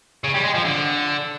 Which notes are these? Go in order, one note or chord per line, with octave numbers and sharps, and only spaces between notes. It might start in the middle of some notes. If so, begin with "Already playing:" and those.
C#3
G3
G#3
F3
D3